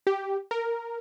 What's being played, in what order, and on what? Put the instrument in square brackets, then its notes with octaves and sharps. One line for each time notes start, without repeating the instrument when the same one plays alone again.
[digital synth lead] G4
A#4